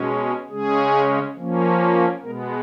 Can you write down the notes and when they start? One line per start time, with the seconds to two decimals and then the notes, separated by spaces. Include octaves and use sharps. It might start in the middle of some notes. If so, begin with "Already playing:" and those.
Already playing: B2 G#3 C#4
0.50 C#3 G#3 C#4 G#4
1.37 F3 A#3 C#4
2.22 B2 G#3 B3 A#4